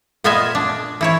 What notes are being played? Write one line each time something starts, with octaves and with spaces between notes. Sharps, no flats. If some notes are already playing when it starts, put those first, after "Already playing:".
A#2 B3 F4 D#5 E5 G#5
D4
E3 E4 C#5